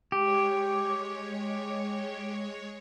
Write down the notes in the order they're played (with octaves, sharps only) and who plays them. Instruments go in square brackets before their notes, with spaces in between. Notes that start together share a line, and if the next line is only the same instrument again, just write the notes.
[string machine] G#3 C#5 [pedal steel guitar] G4